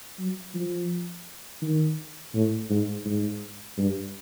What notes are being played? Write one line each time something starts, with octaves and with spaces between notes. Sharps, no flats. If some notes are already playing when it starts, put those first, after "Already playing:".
F#3
F3
D#3
A2
G#2
G#2
G2